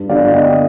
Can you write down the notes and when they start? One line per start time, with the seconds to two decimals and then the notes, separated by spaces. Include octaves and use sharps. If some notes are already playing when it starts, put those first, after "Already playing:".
Already playing: G2
0.09 D3 G3 D4 D5 F5
0.32 G2 D#5 G5